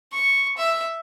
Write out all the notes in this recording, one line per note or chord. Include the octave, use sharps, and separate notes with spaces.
C#6
E5